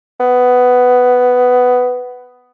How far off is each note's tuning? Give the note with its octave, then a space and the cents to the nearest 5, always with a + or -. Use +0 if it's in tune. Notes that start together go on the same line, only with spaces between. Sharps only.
B3 +10